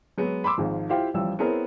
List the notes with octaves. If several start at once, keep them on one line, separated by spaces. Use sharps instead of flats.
F#3 G#3 B3
B5 C6 D6 E6
G#1 G#2 F3
E4 F4 G4 C5 F5 G5
A1 F3 G3 E6
B3 C4 E4 G#4 A#4 C#5